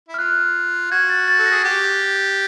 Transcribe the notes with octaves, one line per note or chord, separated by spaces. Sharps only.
E4
F6
F4 F#6
F#4 G#6
A6
A6
A4
G#4 A#6
G4